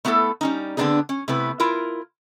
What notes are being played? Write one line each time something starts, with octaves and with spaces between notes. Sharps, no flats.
A3 B3 E4 G4 A4
G3 C#4 D#4
D3 B3 C4 D4 D#4 G#4
C#4
C3 A3 B3 E4 B4
E4 F4 A#4